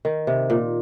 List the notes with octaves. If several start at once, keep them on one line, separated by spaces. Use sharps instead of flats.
D#3
C3
A#2